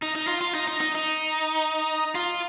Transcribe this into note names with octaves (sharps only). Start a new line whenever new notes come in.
D#4
D#4
F4
F4
D#4
D#4
D#4
D#4
F4